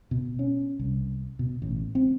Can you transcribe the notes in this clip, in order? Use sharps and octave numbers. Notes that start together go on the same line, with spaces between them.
B2
C#4
C2
B2
A1
C4